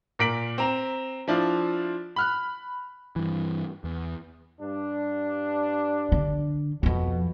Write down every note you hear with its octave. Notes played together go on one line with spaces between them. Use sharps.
A#2 A#4 B6 D7 F#7
C4 A#5 E7
F3 D4 E4 F4
B5 F6 F#6
G2 E3
E2
G2 D4
D3
F2 B2 F3